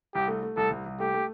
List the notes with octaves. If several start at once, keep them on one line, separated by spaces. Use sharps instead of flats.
C2 G4
A3
A3
C2 A4
C2
C2
A3 G4
A3